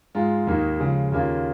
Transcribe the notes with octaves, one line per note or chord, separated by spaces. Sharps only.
G#2 G#3 F4
D#2 D#3 A#3 D#4
C#3 F3 G#3
D#2 C#3 A#3 C#4 F4